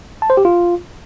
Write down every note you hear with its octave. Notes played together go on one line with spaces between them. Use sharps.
A5
C5
G4
F4